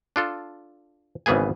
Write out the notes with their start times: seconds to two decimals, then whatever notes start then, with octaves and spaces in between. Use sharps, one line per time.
0.16 D4 F4 A4
1.26 G#1 C#3 E3 B3 G#4 G#5